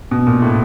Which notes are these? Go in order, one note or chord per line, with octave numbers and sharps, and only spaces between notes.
B2
A#2
A2